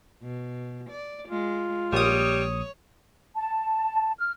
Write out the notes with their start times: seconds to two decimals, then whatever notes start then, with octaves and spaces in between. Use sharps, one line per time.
0.22 B2
0.90 D5
1.29 G#3 F4
1.92 A#1 G3 C#5 D#6
3.35 A5
4.19 F6